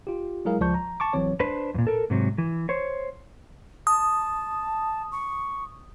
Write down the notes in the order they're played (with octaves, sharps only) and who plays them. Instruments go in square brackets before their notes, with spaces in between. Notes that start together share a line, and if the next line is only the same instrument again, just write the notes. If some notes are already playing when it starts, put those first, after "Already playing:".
[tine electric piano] F4 G4
F#3 G#3 E4 G#4 A#4 F5
C#2 F3 D5 A5 C#6 G6
A#5
A5 C#6 D6
A1 E3 F#3 C4 C#5
[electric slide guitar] D4 B4 C5
F2 A#2
A4 A#4
G#2 C3 F#3
E3
C5 C#5
[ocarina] A5 [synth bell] D#6
[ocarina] C#6